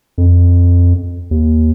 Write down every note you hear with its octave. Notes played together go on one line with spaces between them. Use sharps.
F2
D#2